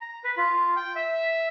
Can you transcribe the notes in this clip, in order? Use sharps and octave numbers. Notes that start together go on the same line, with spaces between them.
A#5
B4
F4
G5
E5